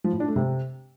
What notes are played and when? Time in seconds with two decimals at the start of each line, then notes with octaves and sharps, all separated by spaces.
0.04 F3
0.12 A2
0.20 D4
0.28 A3
0.36 C3